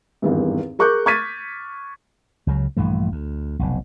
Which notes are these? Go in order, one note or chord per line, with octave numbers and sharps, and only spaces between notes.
G#1 E2 G2
G#4 A#4 C#6 D6 F#6 G6
C#6 F6 G#6 A6 B6 D#7
C#2 C#3 F#3
A#1 G2 E3 A3
D2
F1 B1